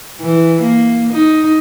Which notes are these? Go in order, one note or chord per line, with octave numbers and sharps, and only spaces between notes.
E3
A#3
D#4